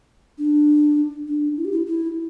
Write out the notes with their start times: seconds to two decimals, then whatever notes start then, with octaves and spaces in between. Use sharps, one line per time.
0.38 D4
1.27 D4
1.57 E4
1.65 G4
1.72 E4
1.87 E4